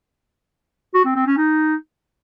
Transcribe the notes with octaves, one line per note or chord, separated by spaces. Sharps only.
F#4
C4
C4
C#4
D#4